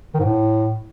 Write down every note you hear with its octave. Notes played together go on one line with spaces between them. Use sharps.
D#3
G#2
A2